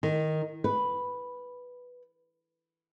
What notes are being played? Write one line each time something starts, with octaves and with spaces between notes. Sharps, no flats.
D#3
B4